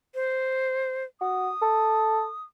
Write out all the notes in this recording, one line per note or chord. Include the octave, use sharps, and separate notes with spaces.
C5
F#4 D#6
A4